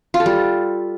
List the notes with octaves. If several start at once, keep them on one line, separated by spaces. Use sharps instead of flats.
F4
A4
G3